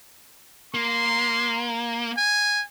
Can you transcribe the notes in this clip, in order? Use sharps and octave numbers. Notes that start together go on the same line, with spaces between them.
A#3 C6
G#5